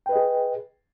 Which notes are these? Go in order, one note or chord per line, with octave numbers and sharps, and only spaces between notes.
G#4 B4 D#5 G5